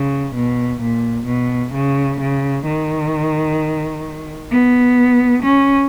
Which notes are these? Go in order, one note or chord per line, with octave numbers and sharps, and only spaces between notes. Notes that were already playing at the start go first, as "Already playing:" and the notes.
Already playing: C#3
B2
A#2
B2
C#3
C#3
D#3
B3
C#4